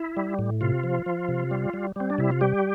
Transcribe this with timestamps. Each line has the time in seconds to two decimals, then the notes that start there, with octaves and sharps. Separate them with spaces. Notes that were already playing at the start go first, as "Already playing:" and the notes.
Already playing: E4
0.17 G3
0.39 A2
0.61 C3 F4
0.84 F3
1.06 F3
1.29 C3
1.51 G3
1.74 G3
1.96 G3 C4
2.10 D4
2.18 C3 E4
2.31 F4
2.41 G3 G4